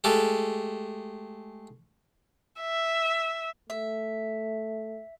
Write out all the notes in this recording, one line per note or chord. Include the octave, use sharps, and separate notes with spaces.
G#3 A3 G4 A4
E5
A3 E5